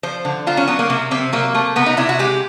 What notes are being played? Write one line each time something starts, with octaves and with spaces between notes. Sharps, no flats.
F3 C5
D3
F#3 F4
C#4
F#3 B3
A#3
C3 A#3
C3 C4
F#3 A#3
A3
C3 B3
D#4
C3 E4
F#4
G#3 G4